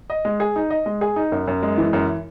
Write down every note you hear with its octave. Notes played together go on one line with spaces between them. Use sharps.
D#5
G#3
G#4
D#4
D#5
G#3
G#4
D#4
F#2
F#2
G#3
E3
F#2